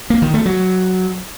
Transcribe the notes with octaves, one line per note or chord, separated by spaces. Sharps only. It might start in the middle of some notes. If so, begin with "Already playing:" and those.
A#3
D#3
A3
F#3